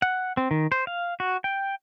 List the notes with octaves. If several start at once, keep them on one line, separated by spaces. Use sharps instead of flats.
F#5
C4
D#3
C5
F5
F#4
G5